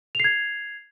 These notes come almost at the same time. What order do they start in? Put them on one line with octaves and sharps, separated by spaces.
F7 C7 G#6